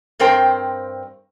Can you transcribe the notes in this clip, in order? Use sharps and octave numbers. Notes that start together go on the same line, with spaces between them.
G2 C4 A#4 C5 G5